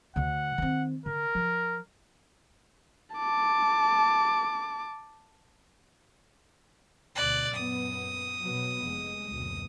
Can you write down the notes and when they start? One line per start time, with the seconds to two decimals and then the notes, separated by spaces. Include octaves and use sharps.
0.16 D2 D3 F#5
0.58 D#3 C4
1.06 D3 A#4
1.35 F3
3.16 A5 D6
7.15 D2 B2 D5 F#6
7.54 F#2 A#2 B3 D#6
8.42 B2 F#3 B3
8.83 F1 G#3
9.33 F#1 D2 B2